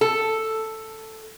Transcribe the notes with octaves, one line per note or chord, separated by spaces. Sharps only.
A4